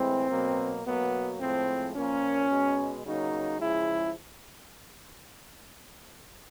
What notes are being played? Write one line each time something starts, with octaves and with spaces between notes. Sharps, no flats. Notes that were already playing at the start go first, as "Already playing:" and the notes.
Already playing: A2 E3 G#3 C4
B2 F#3 A#3
B2 F#3 A#3 B3
A2 F3 G#3 C4
A#2 F3 A#3 C#4
B2 G#3
C#3 F#3 A#3 D#4
C#3 F3 G#3 E4